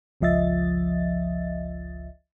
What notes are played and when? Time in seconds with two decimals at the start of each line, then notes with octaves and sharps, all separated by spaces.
0.21 G1 C#2 F3 D#5 E5 A6